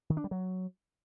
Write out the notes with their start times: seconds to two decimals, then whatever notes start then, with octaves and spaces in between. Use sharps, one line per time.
0.10 D#3
0.17 D4
0.24 G3
0.31 F#3